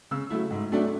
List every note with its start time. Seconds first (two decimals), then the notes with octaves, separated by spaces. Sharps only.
0.11 C#3 E6
0.30 F#3 A3 E4
0.51 G#2
0.72 F#3 A3 D4